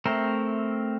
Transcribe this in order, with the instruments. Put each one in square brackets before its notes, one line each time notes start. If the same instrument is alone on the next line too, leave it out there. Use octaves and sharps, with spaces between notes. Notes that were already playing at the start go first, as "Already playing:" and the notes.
[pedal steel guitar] A3 C4 A#4 C5 E5